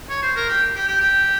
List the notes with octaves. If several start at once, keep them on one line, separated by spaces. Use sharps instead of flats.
C#5
C5
A#4
G4
G4
G4
G4